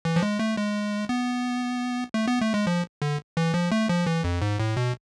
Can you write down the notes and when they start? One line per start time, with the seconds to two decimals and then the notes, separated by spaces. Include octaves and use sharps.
0.05 E3
0.16 F3
0.23 G#3
0.39 A3
0.57 G#3
1.09 B3
2.14 A3
2.28 B3
2.41 A3
2.54 G#3
2.67 F3
3.02 D3
3.37 E3
3.54 F3
3.72 A3
3.89 F3
4.07 E3
4.24 F2
4.42 G#2
4.60 A2
4.77 B2